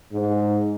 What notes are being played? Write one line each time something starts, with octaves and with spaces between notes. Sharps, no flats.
G#2